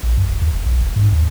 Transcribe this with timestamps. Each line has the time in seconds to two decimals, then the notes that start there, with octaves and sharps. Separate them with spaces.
0.03 A#1
0.17 F#2
0.30 D1
0.42 D#2
0.53 F1
0.66 B1
0.81 E1
0.96 G#2
1.12 D#2